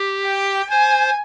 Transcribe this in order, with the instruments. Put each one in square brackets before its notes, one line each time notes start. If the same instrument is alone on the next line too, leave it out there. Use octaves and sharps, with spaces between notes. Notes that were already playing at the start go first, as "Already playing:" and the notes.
Already playing: [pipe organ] G4
[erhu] G5
[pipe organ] C5 [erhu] G#5